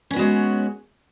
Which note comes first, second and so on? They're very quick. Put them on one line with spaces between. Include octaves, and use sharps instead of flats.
C#4 B3 F#4 G#3 C#5